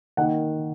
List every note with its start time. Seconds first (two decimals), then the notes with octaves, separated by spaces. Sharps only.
0.17 D#3 A#3 D#4 F#5